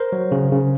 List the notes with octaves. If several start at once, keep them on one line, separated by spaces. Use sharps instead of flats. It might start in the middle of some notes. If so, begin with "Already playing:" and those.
Already playing: A#4 C5
F#3
C#3
C#3